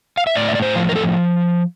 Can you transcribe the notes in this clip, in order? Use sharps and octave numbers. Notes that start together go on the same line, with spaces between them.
F5
E5
A2 D5
E5
D5
C5
F3
A#4
A4